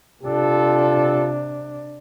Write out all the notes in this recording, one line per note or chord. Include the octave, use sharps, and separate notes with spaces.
C3 D4 F4 G4 A4